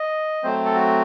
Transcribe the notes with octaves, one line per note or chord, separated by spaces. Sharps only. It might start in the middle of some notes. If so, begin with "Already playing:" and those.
Already playing: D#5
F#3 A3 C4 C5
A4
F#4